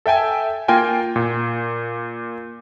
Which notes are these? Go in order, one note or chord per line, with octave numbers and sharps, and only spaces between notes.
A4 E5 G5 G#5
A#3 F4 A#4 G5 G#5
A#2